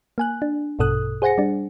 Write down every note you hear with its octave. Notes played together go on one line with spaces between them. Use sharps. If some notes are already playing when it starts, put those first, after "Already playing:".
A#3 G#5 F#6
D4
A#1 G2 B2 A4 D#6 F#6
G#4 C5 F#5 G#5 A#6 C#7
G3 D4